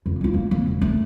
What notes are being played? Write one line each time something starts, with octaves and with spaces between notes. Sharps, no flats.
F2
G#3 F4
A#3
A#3 C4
E1
A3